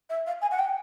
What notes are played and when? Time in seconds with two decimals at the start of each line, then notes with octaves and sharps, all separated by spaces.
0.09 E5
0.26 F5
0.41 G#5
0.51 F#5
0.59 G5